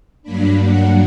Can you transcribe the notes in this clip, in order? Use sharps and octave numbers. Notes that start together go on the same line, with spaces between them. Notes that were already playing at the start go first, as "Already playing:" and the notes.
G2 F#3 A#3 D4 B5
F#5